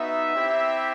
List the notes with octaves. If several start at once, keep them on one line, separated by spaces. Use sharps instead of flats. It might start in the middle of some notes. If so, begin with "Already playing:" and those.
Already playing: B3 D#4 F#4 E5
C4 E4 G4